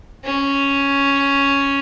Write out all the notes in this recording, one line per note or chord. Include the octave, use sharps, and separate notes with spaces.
C#4